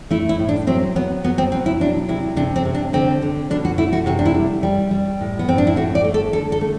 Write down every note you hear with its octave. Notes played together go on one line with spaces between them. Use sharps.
A3 E4
E4
A2
D4
F#3 C4
F#3 B3
F#3 B3
C4
B2 C4
E4
F#3 D4
C3 E4
C3 D4
C4
C3
D4
D3 C4
D3
B2 D4
F#4
A3 E4
F#4
C3 F#4
D4
E4
G3
G3
G3
A2
B3
A2 C4
D4
E4
A3 F#4
D5
A3
A4
D3 A4
A4
A3